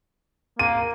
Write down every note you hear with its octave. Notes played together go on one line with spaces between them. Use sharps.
A#3 D#7